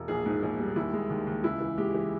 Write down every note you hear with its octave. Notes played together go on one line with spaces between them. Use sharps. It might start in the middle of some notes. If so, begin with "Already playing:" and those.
Already playing: E1
A#1 G#4
G#2
A#1
G3
D#2 E4
G#3
D#2
D#2
C#2 E4
E3
G#3 G4
E3